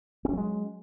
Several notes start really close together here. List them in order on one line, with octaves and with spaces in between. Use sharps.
C4 C#4 F#3 G#3